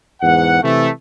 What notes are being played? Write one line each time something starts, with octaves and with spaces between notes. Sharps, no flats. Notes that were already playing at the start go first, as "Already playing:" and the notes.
E2 G#2 F#5
C3 E3 A3